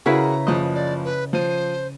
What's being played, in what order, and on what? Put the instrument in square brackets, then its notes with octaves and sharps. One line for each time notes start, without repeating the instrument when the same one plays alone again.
[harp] C#3 E4 B4 [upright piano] F#4 G#4 A#4 [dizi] A#5
[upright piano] F#1 F3 [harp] D#5
[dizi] D5
B4
[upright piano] F3 D#7 [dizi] C5